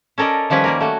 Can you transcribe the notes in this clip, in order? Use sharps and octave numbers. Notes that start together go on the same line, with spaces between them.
C#4 A4 A#4 D5 D#5
D#3 F3 G3 C#4 B4
G3 A#3 A#4
A3 F#4